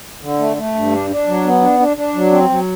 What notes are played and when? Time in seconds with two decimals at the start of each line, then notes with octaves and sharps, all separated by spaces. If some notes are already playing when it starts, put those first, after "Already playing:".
0.22 D3
0.39 A3
0.57 A3
0.75 G2
0.92 D4
1.10 D4
1.27 F#3
1.45 B3
1.62 D4
1.79 D4
1.97 D4
2.15 F#3
2.32 C4
2.50 F#3